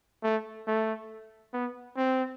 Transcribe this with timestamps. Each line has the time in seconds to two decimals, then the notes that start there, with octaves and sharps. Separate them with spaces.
0.24 A3
0.67 A3
1.53 B3
1.97 C4